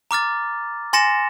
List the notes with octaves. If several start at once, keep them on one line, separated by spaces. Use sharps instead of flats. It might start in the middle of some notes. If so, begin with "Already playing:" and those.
A#5 D6 F6 A6
G#5 C6 A6 A#6 C#7 E7